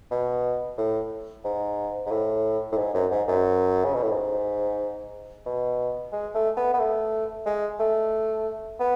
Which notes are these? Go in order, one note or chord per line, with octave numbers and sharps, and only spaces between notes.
B2
A2
G#2
G#2
A2
A2
G#2
F#2
G#2
F#2
C#3
B2
A2
G#2
B2
G#3
A3
B3
B3
A3
G#3
A3
B3